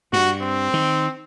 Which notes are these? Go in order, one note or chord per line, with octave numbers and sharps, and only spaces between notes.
G2 F#4
C4
D#3